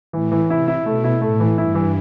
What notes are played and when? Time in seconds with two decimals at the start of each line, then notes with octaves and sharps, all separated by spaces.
0.13 A2 E3
0.32 E3
0.50 C3 E4
0.68 E4
0.86 B2 A3
1.04 E4
1.21 A2 A3
1.40 E3
1.57 G2 E4
1.75 E3